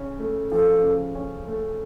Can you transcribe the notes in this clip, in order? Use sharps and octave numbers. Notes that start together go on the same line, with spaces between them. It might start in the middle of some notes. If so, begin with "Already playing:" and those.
Already playing: C#3 C#4
A3
F3 A4
C#3
C#4
A3